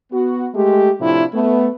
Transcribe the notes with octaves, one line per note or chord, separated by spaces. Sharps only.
B3 F#4
G#3 A3 G4
A2 C3 F3 D4 E4 F4
A3 B3